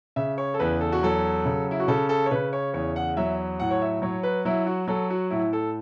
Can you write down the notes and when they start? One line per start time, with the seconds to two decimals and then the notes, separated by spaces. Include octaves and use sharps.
0.16 C#3 E5
0.38 C#5
0.54 A4
0.59 E2 B4
0.81 A4
0.92 F#4
1.03 F#3 A4
1.45 C#3
1.71 E4
1.80 F#4
1.88 C#3 A4
2.09 A4
2.26 C#5
2.31 C#3 B4
2.53 C#5
2.73 E2 C#5
2.96 F#5
3.17 F#3 E5
3.59 A2 F#5
3.71 C#5
3.82 E5
4.02 F#3 C#5
4.23 B4
4.45 F#3 E4
4.67 F#4
4.88 F#3 A4
5.10 F#4
5.30 A2 E4
5.53 A4